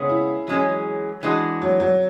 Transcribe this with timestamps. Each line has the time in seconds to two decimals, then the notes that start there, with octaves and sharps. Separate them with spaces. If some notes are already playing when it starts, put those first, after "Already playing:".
Already playing: C#3 G#3 B3 C#4 G#4
0.09 E4
0.47 E3 F#3 G#3 C#4 G#4
1.23 E3 G#3 D4 F#4
1.62 F#3
1.80 F#3